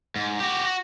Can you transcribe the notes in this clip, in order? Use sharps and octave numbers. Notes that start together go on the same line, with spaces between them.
G#2
F#4 G4
F#4